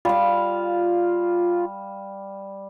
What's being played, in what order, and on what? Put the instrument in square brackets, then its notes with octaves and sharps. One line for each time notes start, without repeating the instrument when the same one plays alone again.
[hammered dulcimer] G3 F5 [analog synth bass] F4